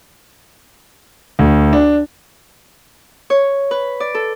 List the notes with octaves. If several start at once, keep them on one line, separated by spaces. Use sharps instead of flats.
D2
D4
C#5
B4
D5
A4